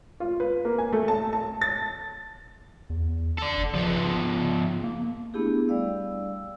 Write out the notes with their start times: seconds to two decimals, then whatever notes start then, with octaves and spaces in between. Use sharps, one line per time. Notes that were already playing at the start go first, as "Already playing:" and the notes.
0.20 F4
0.40 B4
0.65 A#3
0.78 G#5
0.93 A3
1.08 A5
1.33 A5
1.61 A6
2.90 E2
3.38 A4 D5
3.57 F#1
3.75 C#3 F3 B3
4.84 A#3
5.34 A3 B3 D4 E4 G4 G#4
5.68 G3 D5 F5 E6